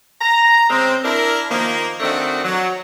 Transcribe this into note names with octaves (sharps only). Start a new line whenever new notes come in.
A#5
C#3 G#3 C4
D4 E4 A#4
D#3 F3 A#3
D#3 A3 C4 D4 F#4
F#3